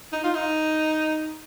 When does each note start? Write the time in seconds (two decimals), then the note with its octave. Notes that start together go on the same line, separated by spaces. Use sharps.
0.12 D#4
0.24 F4
0.34 D#4